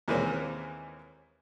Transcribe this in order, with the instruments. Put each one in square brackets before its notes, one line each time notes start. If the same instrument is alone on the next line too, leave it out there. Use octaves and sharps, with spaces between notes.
[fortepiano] D#2 E3 G#3 A#3 C4 C#4